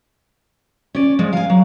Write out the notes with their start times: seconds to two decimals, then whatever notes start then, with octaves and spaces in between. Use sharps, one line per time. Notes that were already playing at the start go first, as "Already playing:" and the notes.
0.95 C#4 D5
1.19 F3 G#3
1.33 F5 G#5
1.50 F#3